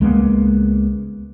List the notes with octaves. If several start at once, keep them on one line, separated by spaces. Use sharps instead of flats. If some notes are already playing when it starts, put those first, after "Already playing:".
C#2 G#3 A#3 B3